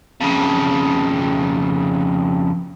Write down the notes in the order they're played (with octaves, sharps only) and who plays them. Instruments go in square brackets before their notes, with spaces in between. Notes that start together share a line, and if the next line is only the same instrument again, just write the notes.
[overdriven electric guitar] F2 C#3